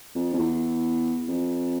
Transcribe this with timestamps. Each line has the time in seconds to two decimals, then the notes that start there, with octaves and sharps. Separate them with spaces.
0.15 F2
0.33 F2
0.38 E2
1.28 F2